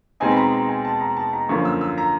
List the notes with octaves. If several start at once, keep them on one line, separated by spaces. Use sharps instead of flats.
B2 G#3 C4 D#4 G#5
B5
A#5
A#5
G#5
A5
A#5
A5
A#5
F#2 D3 F3 A#3 C#6
E6
E6
A#5